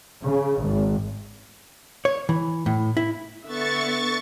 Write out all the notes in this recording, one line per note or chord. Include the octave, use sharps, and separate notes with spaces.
C#3
G#1
C#5
E3
A2
E4
D3 B3 E5 C#6 A6